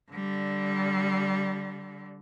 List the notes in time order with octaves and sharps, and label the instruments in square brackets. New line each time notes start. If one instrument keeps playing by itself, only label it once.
[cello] D3 G3